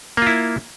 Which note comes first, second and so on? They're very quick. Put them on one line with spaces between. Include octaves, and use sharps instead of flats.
A#3 F4 E4